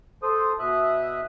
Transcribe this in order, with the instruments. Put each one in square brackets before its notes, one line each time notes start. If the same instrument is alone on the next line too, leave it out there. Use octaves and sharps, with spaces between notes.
[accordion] A4 C5 D#6
B2 E5 D#6 F#6